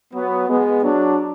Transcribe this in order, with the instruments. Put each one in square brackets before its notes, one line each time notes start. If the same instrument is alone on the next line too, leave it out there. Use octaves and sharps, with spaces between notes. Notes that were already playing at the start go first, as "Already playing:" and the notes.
[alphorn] F#3 [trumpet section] B3
[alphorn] G#3 [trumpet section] B3
[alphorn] F#3 [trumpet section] D4